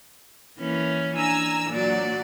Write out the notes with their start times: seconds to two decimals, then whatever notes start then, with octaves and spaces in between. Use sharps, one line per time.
0.59 E3 A#3 C#4
1.16 D4 G#5 A#5 E6
1.70 A#2 F#3 D5